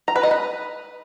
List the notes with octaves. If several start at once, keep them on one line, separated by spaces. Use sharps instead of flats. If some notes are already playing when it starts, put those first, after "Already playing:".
A#5
B4
D#5
B4